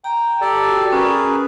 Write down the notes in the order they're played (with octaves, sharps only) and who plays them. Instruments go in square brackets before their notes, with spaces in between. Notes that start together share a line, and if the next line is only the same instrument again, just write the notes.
[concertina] G5 [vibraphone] A#5
[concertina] G4 A4 D5
[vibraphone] F#4
[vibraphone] C#4 [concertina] G#4 A#4 B4